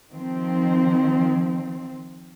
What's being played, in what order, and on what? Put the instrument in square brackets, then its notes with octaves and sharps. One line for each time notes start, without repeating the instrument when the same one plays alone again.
[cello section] D#3 F3 C4